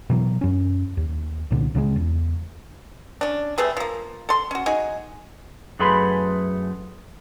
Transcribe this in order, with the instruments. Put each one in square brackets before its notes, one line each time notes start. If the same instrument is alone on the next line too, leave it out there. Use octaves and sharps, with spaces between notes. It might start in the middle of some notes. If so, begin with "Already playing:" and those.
[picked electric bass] B2 E3 F#3
F#2 C#4
D#2
C2 A#2 D3
C#2 C#3 F#3 G#3
E2
[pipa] C#4 D4
C3 A3 G#4 B4
F3 A#3
A4 C6
C#4 F#4
D#4 F#4 G#4 G#5
[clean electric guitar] F#2 A3 G#4 B4 B5 C6